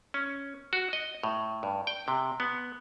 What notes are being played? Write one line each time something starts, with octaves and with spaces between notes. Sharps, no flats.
C#4
F#4
D#5
A2
G2
G5
C3
B3